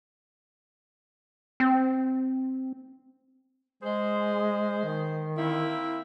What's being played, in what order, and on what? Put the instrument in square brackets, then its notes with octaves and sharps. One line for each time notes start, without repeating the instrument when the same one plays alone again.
[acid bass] C4
[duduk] G#3 [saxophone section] G#4 C5
[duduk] D#3
[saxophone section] A#3 C4 E4